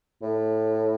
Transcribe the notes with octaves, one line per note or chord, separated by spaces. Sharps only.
A2